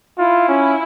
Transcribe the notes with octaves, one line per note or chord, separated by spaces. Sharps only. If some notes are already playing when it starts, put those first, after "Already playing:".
E4 F4
C#4